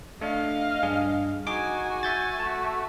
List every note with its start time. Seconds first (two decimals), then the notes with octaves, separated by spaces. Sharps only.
0.21 A3 D4 D#5 F5
0.83 G2 D4 G#4
1.47 D#4 F#4 G#4 G#5 D6
2.03 E5 G6 A6
2.40 A3 F#4 A5